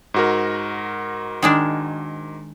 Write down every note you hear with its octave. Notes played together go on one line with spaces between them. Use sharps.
G#2 F#4 A#4
D#3 G#3 D4